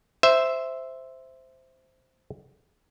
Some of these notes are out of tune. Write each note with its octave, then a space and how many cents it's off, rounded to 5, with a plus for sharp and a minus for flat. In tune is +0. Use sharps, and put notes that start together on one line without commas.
C5 -5 E5 +0